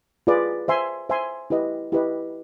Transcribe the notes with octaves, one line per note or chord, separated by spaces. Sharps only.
F4 G#4 B4 D5
C5 E5 G#5 C6
C5 E5 G#5 C6
E4 G4 B4 D#5
E4 G4 B4 D#5